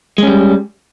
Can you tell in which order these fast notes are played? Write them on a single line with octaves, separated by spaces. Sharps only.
G#3 C#4 G3